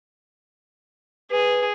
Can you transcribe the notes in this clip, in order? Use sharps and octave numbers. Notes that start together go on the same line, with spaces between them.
G#4 B4